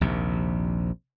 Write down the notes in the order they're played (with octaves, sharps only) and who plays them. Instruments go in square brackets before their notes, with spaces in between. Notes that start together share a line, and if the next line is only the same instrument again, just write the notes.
[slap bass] A#1 D#2 C3